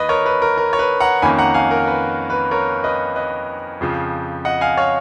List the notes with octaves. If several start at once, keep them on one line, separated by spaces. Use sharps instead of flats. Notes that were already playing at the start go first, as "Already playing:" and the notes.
Already playing: D#2 B4 D#5
A#4 C#5
B4
A#4
A#4
C#5
B4
F#5 A#5
F2 D#3 A#3 C#4 G#5 B5
F#5 A#5
F5 G#5
A#4
B4
B4
A#4 C#5
B4 D#5
B4 D#5
F2 C#3 F3
D#5 F#5
F5 G#5
C#5 F5